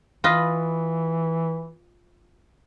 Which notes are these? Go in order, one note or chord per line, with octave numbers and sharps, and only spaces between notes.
E3 F4 B4 D#5